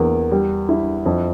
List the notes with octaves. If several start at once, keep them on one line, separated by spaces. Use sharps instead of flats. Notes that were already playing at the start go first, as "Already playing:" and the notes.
Already playing: E2 A#3
G3
E4
F2